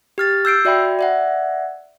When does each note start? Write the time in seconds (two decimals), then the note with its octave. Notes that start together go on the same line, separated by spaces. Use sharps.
0.18 G4 F6 A6
0.45 E6 G6 C7 D7
0.65 F#4 D5 E5 G5 B5
0.99 D5 E5 F#5